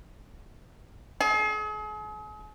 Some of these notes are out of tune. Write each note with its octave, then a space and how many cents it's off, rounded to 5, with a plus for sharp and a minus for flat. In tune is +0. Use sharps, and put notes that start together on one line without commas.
G#4 +40